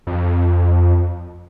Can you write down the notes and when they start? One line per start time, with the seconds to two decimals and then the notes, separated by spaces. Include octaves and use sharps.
0.07 F2